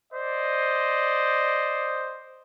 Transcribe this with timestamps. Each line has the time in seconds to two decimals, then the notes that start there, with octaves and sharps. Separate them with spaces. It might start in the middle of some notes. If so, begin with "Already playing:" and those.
0.12 C5 D5 D#5